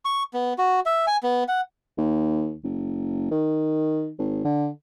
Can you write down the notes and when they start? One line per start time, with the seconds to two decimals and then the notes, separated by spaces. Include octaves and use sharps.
0.05 C#6
0.34 B3
0.58 F#4
0.86 E5
1.07 G#5
1.23 B3
1.48 F#5
1.97 D#2
2.64 F#1
3.31 D#3
4.19 G#1
4.44 D3